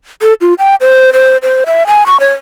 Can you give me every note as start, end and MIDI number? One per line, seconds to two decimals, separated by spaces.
0.22 0.34 69
0.41 0.54 65
0.59 0.75 79
0.81 1.11 72
1.13 1.37 72
1.43 1.64 72
1.66 1.87 76
1.87 2.06 80
2.06 2.20 85
2.20 2.32 73